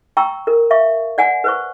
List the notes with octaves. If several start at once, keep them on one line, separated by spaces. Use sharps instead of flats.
G5 A#5 C#6 E6
A#4
E5 F5 C#6
D5 F#5 G#5
B4 C5 C#6